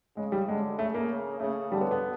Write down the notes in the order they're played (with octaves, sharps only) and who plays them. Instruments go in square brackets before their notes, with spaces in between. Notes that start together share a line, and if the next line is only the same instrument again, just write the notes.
[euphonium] C#3 [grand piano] G#3
[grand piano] G3
[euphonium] D3 [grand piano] G#3
[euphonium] C#3 [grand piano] A3
[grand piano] A#3
[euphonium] C#3
[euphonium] C#3 [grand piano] A3
[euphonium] D3 [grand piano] G3
[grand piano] B3
B3